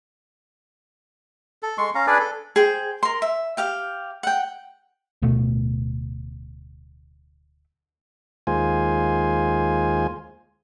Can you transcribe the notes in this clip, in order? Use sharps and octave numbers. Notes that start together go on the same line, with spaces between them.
A4
G#3 C6 C#6
C#4 F5 A#5
D4 G#4 B4 D5
A4
G#4 C5 G5
A#4 C6
E5
G4 F5 G5
F#5 G5
D1 B2 A3
D#2 G#3 F4 C5 G#5